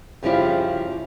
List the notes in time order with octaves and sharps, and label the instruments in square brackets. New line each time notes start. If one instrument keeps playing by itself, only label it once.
[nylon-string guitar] F#2 C#3 F3 G3 E4 G4